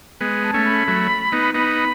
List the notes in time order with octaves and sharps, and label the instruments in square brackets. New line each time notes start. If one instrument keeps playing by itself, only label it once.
[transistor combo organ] G#3 B3 [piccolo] G#5
[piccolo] A5
[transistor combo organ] A3 C#4
[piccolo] B5
[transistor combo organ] F#3 A3
B3 D#4
[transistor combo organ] B3 D#4 [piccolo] B5